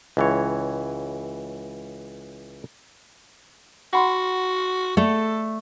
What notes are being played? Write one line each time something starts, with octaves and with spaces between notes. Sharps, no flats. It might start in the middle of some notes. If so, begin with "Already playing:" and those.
C#2 E3 C#5
F#4 F#5 B5 C6
A3 A4 D5